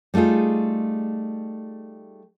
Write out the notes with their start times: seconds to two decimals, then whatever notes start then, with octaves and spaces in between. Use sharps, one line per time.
0.14 G3 A3 D#4 F4 G#4